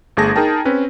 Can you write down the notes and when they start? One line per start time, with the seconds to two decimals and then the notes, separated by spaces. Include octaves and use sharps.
0.17 G1 A3 G#4 A5 A#6
0.36 D#4 G#4 A#4 G5 A5
0.65 C4 C#4 B4